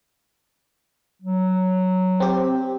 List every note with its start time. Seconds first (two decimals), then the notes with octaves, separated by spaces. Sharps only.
1.22 F#3
2.20 C4 G4